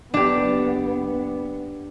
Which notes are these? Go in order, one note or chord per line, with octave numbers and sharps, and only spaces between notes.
F#1 B3 D4 G4